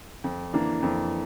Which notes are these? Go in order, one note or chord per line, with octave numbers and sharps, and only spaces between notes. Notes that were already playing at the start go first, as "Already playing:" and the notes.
F2
E3 A#3 D4
F2